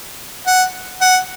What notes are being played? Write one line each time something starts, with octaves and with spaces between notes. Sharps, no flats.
F#5
F#5